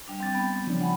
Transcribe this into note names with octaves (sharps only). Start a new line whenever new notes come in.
G3 D4
C4 G5 A6
B3
C#3 F3 D4
F#5 G#5 B5